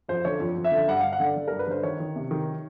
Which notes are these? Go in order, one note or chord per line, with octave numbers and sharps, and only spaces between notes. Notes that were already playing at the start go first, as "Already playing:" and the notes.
F2 C5
D3 C#5
F2
F2
E5
D3
G2 F#5
G2 F5
F#5
D3 D5
D3
G2 A#4
B4
D3 C5
D#3 C#5
D#3
C3
D#3